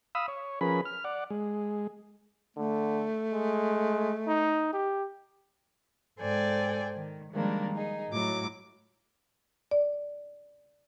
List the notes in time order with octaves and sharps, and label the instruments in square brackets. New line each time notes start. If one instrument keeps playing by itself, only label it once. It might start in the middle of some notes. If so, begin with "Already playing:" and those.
[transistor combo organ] F5 B5 D#6 E6
C#5
F3 C#4 G#4 A#4 B4 B5
F6
D5 F#5
G#3
[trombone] D3 [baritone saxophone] A3
[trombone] G#3
D#4
G4
[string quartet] G#2 A4 C5 D5 G5 G#5
D#3
D#3 F3 G3 G#3 A#3 D4
D#4 G#4
A2 F#3 D6
[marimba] D5